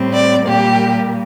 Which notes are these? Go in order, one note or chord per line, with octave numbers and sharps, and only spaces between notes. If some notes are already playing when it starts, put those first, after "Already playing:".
Already playing: A2 G3 C4
D5
A#2 G3 A#3 G4